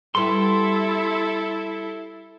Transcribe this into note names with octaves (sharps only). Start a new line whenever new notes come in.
G3 B3 E4 A4 C6